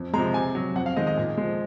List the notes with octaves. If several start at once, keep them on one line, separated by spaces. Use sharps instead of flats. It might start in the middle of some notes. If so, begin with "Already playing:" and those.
Already playing: F2
C3 F3 G#3 A#5
C3 G#5
F#3
F2 F#5
F5
D#3 G#3 D#5
D#5
A#2
F3 G#3